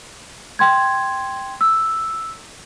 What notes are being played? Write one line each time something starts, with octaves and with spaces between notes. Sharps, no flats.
G5 C6 G#6
E6